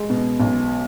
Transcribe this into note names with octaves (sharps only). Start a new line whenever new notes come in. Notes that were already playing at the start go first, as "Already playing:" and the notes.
Already playing: G#3
B2
B1